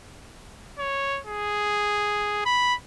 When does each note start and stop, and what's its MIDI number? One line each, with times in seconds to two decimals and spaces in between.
0.79 1.20 73
1.26 2.45 68
2.46 2.74 83